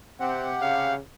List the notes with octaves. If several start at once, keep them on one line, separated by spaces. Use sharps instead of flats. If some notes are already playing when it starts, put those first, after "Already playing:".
C3 C4 G4 F#5
C#3 F5